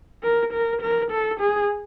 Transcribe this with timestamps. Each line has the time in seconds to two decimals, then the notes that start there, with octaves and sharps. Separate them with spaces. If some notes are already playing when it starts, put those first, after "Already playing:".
0.23 A#4
0.53 A#4
0.82 A#4
1.11 A4
1.40 G#4